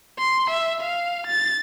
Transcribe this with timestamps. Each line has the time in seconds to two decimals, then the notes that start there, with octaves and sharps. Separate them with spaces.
0.19 C6
0.50 E5
0.81 F5
1.27 A6